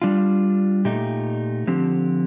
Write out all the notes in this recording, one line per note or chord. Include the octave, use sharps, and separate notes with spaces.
G3 D4 F4
A#2 A3 D#4 G4
D3 F3 C4 G4